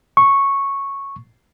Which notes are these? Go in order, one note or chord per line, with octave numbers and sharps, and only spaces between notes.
C#6